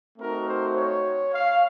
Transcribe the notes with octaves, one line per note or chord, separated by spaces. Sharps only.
A3 C4 D#4 F#4 A#4
C5
C#5
F5